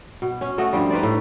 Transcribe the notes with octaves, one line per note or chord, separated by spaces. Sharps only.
B2
C#4
A3 F#4 D#5
G2 F3 G3
D#4 B4 C5 D5
A2